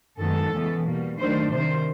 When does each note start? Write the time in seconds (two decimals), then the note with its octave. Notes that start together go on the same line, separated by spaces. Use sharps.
0.19 F#2 D#3 G#3 B3 A4
0.52 E2 C#3 E3 G#3 B3
0.84 B2 G3 A#3
1.18 D#3 F#3 A3 D4 C5
1.50 C3 D#3 G3 C5